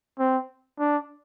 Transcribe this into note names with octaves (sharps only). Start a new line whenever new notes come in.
C4
D4